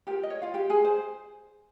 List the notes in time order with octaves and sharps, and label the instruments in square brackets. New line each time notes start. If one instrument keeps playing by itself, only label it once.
[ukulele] F4 G4 A#4 G5
D#5
C#5
F4 F5
G4 G5
G#4 G#5
C5